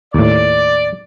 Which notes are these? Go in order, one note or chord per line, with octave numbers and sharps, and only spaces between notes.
D#2 A2 D5